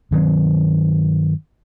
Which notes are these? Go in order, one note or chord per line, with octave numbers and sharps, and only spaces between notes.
G2 D#3 F#3 C4